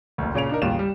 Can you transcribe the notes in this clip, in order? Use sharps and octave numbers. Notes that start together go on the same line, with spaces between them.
F#1 D2
A#2 C#3 C#4 D7 F7
D4 D#4 A#4
A1 D#2 C#3 G3 F4 E7
G3